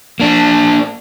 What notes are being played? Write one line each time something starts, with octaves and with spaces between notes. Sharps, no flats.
A#3 D4